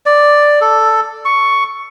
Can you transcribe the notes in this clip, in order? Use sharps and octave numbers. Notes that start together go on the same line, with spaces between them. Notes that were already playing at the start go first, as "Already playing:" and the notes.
D5
A4
C#6